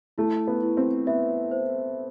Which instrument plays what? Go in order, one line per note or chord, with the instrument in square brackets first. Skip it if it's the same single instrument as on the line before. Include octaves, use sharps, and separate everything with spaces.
[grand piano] A3 [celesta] E4
[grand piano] B3
[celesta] E4
[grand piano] C4
[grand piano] B3 [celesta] E5
[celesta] C5